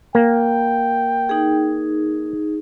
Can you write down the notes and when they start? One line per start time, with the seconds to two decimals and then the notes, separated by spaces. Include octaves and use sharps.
0.15 A#3 G5
1.29 D#4 G#4